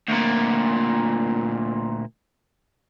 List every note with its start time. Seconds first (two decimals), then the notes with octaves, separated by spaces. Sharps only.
0.08 D2 A#2